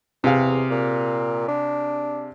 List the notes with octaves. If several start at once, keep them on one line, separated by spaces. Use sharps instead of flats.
E2 C3 G#4 F5
A#2
D4